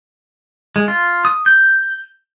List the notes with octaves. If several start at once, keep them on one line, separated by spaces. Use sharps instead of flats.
G#3
F4
D#6
G6